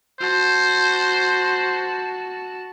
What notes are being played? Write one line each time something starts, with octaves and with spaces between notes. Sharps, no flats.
F#4 C5 A5